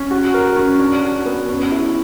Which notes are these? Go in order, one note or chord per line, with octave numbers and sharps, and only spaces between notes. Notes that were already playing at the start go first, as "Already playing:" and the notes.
Already playing: C#4
F#4
A#4
C#4
D4
F#4
B3
C#4
E4